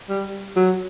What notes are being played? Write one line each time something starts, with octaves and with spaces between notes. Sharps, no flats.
G3
F#3